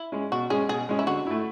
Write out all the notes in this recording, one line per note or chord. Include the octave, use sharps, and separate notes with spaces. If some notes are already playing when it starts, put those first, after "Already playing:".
Already playing: E4
G#3 C#4
B2 F#4
G#3 C#4 G#4
B2 G#4
G#3 C#4
E4
D3 F#4
A3 E4